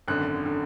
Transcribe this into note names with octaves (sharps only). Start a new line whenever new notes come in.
G#1 F#2 D3 F#6
D3